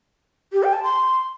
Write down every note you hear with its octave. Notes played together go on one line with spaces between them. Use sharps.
G4
G5
A5
C6